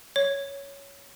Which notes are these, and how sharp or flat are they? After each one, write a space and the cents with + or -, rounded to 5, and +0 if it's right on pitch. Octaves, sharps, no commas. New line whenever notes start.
C#5 +10